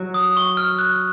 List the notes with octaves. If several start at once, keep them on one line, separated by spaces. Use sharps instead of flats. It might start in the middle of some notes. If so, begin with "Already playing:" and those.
Already playing: F#3
D#6
C#6
F6
F#6